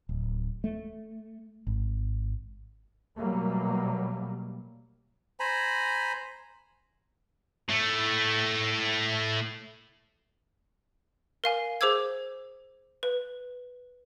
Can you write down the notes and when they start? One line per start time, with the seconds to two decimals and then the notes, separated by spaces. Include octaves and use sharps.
0.09 D1
0.64 A3
1.67 G#1
3.17 B2 F#3 G3 A3 A#3
5.40 C5 G#5 A#5 B5
7.69 A2 A3
11.44 A#4 F5 G#5
11.81 G#4 C5 D6 E6 G#6
13.03 B4